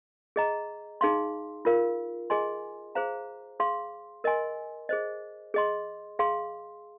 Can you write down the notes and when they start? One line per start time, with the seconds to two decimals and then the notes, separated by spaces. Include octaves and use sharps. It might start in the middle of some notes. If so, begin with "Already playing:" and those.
0.36 G#4 D#5 A#5
1.01 D#4 G#4 F5 C6
1.65 F4 A#4 F5
2.30 G#4 D#5 G#5 C6
2.95 G#4 C5 F5 A#5
3.60 G#4 F5 C6
4.24 A#4 D#5 G#5 C6
4.89 G#4 C5 D#5
5.54 G#4 D#5 C6
6.19 G#4 F5 C6